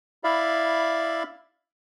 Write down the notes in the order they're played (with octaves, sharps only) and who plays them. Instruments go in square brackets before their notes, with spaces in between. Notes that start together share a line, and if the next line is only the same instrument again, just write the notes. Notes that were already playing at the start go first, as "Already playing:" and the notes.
[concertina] E4 D5 E5 F5 B5